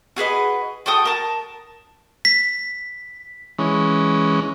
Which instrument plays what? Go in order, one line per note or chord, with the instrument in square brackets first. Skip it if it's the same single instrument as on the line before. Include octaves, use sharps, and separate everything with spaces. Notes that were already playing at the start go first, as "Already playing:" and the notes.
[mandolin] F#4 G#4 B4 D#5
F#4 A4 G5 D#6
A#4 A5
[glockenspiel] B6
[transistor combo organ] E3 G#3 C#4